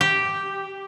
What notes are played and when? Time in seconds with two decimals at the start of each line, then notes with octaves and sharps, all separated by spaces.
0.01 G4